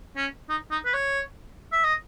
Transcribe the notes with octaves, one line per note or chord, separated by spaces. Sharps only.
C#4
D#4
D#4
B4
C#5
E5
D#5